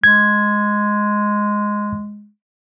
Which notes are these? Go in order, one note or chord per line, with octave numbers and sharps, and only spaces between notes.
G#3 G#6